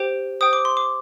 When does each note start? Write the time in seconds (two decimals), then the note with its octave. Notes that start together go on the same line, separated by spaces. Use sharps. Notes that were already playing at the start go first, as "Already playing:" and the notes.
Already playing: G4 C5 G5
0.41 C5 G5 D#6
0.53 D6
0.65 C6
0.77 D6